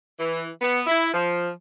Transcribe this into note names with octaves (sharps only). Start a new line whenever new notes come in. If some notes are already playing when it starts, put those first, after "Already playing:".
E3
B3
E4
F3